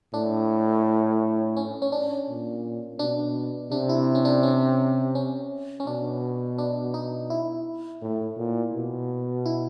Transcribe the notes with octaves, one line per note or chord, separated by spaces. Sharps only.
A2 D4
C#4
C#4
D4
A#2
B2 D4
C3 D4
E4
C#4
D4
C#4
C#4
C#4
B2 D4
D4
D#4
E4
A2
A#2
B2
E4